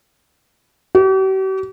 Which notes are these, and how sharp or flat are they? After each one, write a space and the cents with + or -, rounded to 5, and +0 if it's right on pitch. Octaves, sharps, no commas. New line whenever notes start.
G4 -45